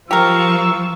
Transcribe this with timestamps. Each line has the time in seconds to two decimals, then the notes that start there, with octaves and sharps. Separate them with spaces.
0.11 F3 G4 A#4 F5 C#6 E6